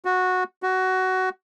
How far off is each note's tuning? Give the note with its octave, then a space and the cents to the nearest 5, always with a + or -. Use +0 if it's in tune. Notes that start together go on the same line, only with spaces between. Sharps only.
F#4 -10
F#4 +15